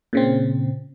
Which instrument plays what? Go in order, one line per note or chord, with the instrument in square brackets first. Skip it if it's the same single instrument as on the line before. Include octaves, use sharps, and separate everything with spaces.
[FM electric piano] A#2 C#3 C4